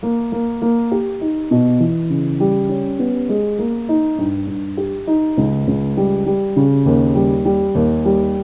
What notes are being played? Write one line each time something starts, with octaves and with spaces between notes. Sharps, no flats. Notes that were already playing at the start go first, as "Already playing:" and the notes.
A#3
A#3
A#3
G4
D#4
B2
E3
C#3
G3
C#4
B3
G#3
A#3
D#4
G2
G2
G4
D#4
C#2
C#2
G3
G3
C#3
D#2
G3
G3
D#2
G3